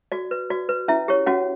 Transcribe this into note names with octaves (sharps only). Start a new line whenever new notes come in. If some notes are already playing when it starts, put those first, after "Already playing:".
F#4 D5
B4
F#4 D5
B4
C#4 E4 E5
G4 C#5
C#4 F#4 F#5